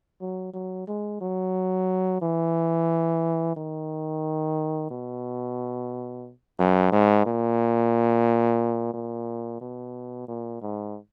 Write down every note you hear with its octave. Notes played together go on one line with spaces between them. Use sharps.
F#3
F#3
G#3
F#3
E3
D#3
B2
F#2
G#2
A#2
A#2
B2
A#2
G#2